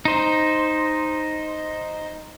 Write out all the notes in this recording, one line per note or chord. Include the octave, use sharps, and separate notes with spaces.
D#4 C5